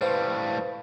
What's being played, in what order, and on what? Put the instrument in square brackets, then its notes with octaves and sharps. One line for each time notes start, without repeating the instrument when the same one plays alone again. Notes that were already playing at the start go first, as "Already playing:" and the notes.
[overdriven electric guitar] A2 G3 [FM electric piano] B4 C5 F5